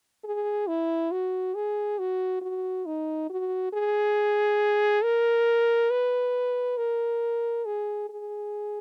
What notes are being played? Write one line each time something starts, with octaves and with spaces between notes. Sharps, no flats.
G#4
E4
F#4
G#4
F#4
F#4
D#4
F#4
G#4
A#4
B4
A#4
G#4
G#4